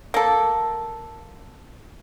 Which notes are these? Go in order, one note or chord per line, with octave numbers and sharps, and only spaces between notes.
A#3 A4